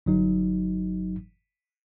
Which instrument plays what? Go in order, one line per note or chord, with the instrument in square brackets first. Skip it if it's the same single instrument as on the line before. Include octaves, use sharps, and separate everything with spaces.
[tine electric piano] G1 F#3 D#4